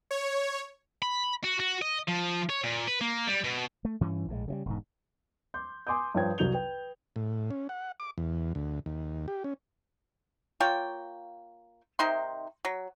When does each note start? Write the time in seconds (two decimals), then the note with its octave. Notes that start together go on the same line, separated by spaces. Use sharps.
0.11 C#5
1.02 B5
1.44 F#4
1.60 F#4
1.82 D#5
2.08 F3
2.50 C#5
2.64 A#2
2.88 B4
3.01 A#3
3.27 G3
3.44 B2
3.85 A3
4.01 G2 E3 C#4
4.28 A#1 A2 D3 G#3
4.48 C#3 E3 G3
4.66 E1 G#2
5.54 C6 D6 G6
5.87 G#5 C6 D6 D#6 G6
6.15 G2 F3 C#5 G5 G#6
6.38 C2 F#3 G6 F7 G7
6.54 B4 G5
7.16 A2
7.51 C#4
7.69 F#5
8.00 D6
8.18 E2
8.55 D2
8.86 D#2
9.28 G4
9.44 C#4
10.60 A#3 F4 C#5 G5
11.99 C3 D#3 D#4 C6
12.65 F#3